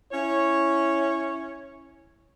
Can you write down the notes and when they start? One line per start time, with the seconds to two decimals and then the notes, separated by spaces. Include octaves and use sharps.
0.12 C#4 E4 C#5